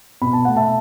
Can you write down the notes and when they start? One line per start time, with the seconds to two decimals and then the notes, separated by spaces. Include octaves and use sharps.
0.22 B2 B5
0.33 A5
0.45 A3 F#5
0.56 E5 A5